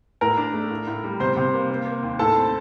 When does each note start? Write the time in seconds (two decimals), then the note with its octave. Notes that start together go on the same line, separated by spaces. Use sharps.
0.21 A2 A#4 A#5
0.38 D4
0.54 A3
0.71 A2
0.87 A2
1.04 G3
1.20 C3 C5 C6
1.36 C3
1.54 A#3
1.70 A#3
1.86 A#3
2.03 D#2
2.19 A2 A4 A5
2.36 C4